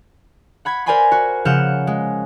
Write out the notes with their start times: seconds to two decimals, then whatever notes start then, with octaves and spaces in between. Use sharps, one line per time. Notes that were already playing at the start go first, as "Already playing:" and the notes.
0.65 F#5 B5 G#6
0.86 A#4 C5 D5 G#5 B5 C6
1.12 F#4
1.45 C#3 F3 F#5 F6 G6 E7
1.87 G#3